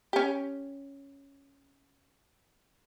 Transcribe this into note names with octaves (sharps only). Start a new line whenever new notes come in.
C#4 G4